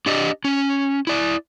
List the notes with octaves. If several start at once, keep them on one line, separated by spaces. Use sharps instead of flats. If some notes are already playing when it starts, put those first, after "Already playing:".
D4 G4 D5 D#5
C#4
E4 D5